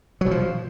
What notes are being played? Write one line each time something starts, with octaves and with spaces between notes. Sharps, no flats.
F#3
B2
F3